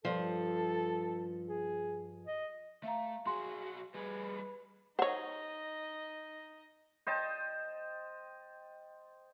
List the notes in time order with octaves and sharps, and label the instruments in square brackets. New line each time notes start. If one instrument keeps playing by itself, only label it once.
[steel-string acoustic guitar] G2 F3 [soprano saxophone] A4
[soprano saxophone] G#4
D#5
[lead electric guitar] A3 [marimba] E5 F5 A#5
[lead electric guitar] B1 F#4 [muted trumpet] G#4 [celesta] C6
[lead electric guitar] G3 G#4 [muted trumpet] B4
[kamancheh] D#4 D#5 [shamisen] C5 C#5 [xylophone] F#5
[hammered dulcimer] C5 D#5 G5 A5